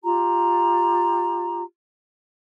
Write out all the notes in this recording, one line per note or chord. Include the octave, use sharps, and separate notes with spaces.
F4 G4 A#5